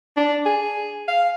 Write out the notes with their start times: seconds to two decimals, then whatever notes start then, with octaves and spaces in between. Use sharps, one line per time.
0.17 D4
0.46 G#4
1.08 F5